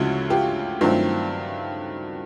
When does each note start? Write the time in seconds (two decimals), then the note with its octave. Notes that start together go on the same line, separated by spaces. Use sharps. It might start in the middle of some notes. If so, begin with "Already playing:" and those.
Already playing: D2 C#3 F3 G#3 C#4 E4 F#4
0.30 F4 G4
0.81 G2 D#3 F#3 A3 C4 F4